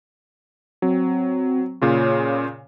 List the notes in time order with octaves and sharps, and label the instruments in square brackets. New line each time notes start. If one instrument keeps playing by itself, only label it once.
[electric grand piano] F#3 [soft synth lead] C4
[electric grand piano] A#2 C#3 F4 [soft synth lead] C#5